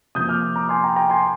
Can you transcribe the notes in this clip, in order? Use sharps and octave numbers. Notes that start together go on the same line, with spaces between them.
C3 F3 A#3 D#6 G6
D6 F6
A#5 D6
G#5 C6
G5 A#5
G5 A#5
G#5 C6